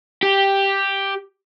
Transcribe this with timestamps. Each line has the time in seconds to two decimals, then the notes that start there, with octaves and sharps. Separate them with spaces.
0.23 G4